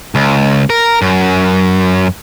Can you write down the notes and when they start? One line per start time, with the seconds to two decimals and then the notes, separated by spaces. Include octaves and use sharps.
0.15 C#2
0.70 A#4
1.02 F#2